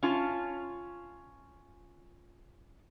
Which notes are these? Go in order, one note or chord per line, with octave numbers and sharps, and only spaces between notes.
C#4 F4 A5